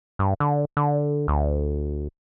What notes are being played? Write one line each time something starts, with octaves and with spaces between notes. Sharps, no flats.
G2
D3
D3
D2